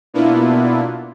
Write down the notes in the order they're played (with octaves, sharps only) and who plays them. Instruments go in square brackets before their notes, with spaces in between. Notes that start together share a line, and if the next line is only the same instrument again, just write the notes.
[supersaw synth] B2 A#3 B3 D4 E4 F4